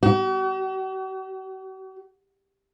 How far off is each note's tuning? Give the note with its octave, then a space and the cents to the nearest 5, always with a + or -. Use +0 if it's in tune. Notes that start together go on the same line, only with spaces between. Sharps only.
F#4 +45